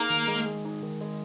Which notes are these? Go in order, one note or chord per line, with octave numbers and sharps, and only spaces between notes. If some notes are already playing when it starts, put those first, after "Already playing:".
Already playing: A#3 D#4 G#4
D#3
G#3
G#4
D#4
D#3
G#3